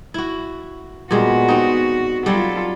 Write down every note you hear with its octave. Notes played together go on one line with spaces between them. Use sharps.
E4 F#4
A#2 G3 G#3 B3 F#4
C4 D#4
F#3 G3 F4 A4